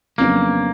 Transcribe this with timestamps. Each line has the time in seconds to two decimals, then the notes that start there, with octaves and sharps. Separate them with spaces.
0.18 F2 C#3 F#3 A#3 B3 D4